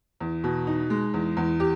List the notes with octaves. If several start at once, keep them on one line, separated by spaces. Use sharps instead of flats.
E2
B2
D#4
G#3
E2
E2
G4